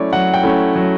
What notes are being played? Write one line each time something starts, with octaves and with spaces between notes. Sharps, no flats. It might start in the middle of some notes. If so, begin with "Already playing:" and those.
Already playing: F#3 A3 C#4 E4 C#5 D5
F#3 F#5
G5
A3 C#4 E4
F#3